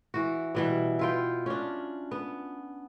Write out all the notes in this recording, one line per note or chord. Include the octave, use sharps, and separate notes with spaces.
E3 F#4
B2 E3 G3
E4 F4 G5
C#4 D4
B3